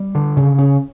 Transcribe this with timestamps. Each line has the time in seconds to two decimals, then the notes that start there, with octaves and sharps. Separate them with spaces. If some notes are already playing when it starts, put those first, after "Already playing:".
Already playing: G3
0.15 D3
0.37 C#3
0.58 C#3